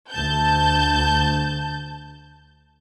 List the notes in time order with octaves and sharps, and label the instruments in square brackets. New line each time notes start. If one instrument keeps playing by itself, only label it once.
[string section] D2 A5 G6